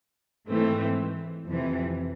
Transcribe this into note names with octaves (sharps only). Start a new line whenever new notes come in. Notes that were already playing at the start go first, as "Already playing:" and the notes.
G#2 E3 A3 C4
F2 C3 E3